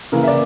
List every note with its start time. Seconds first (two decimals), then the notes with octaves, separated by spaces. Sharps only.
0.12 C#3 E3 A#3 A#4
0.23 E5
0.28 D5